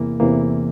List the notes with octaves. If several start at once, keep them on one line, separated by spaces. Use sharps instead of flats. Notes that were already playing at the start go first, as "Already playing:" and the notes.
Already playing: E2 C3 E3 A#3
E2 C3 E3 A#3